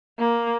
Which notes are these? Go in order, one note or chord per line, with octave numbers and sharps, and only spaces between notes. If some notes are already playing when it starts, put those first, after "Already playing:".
A#3